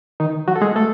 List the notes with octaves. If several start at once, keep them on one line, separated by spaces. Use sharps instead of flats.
D#3 D#4
F#3 F#4
A4
G#3 G#4
A3 A4